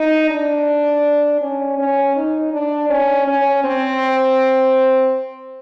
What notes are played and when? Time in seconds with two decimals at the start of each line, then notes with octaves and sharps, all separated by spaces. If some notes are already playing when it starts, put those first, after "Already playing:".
Already playing: D#4
0.30 D4
1.41 C#4
1.78 C#4
2.16 D#4
2.53 D4
2.90 C#4
3.27 C#4
3.64 C4